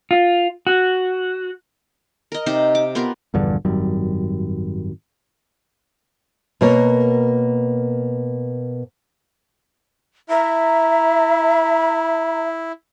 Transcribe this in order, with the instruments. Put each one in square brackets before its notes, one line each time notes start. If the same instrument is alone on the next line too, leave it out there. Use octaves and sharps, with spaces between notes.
[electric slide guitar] F4
F#4
[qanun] A#4 D#5
C3 D#4 G4 C5
D6
B3 F4 G4 A#4
[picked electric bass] A#1 E2 G2 D3
G#1 F#2 G3
[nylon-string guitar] B2 A#3 A#4 C#5
[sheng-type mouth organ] E4 [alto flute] E5 [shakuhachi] A#5